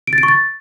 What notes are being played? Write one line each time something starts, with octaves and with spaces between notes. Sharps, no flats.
D7
A6
D7
C#6
A6